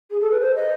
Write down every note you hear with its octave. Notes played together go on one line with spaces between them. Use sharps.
G#4
A4
B4
C5
D#5